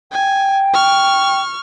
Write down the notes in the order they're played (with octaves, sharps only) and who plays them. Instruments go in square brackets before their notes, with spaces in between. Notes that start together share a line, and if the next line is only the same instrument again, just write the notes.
[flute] G5 [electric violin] G#5
[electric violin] C#6 F6